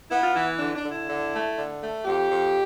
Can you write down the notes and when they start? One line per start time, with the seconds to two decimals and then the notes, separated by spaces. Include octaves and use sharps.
0.11 B3 E4
0.24 F4
0.35 E3 E4
0.59 D3 D4
0.75 D4
0.83 D3
0.92 E4
1.08 D3
1.33 A3
1.57 D3
1.81 A3
2.05 F2 G4
2.29 F2